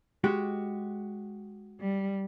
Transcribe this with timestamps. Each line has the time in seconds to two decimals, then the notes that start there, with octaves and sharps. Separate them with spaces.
0.24 G#3 F#4 G4
1.80 G3